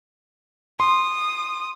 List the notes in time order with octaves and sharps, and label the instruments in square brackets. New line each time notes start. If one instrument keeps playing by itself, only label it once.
[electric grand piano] C6 [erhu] D#6